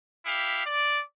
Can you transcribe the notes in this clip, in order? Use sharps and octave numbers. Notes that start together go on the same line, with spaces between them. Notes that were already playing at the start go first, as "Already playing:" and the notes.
E4 G4 F5
D5